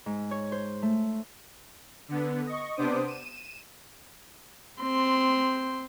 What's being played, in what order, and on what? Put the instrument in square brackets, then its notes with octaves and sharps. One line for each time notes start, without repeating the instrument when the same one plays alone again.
[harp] G#2
C#5
C5
A3
[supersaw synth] D3 B3
D#5 C#6
C3 B3 D4 C5 D6 D#6
D#7 E7
[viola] C4 C6